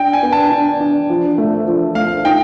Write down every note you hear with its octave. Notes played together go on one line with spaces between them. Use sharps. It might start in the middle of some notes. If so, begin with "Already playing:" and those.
Already playing: D4 G5
G#5
B3
A5
D4
D4
F3
A3
F3
A3 F5
D#4 G5